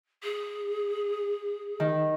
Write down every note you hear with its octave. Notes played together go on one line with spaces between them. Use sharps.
G#4
D#3